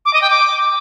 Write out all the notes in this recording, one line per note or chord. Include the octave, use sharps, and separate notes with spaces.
D6
D#5
G5
D6